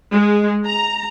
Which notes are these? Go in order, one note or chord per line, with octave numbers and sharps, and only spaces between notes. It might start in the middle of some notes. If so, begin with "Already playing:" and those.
G#3
A#5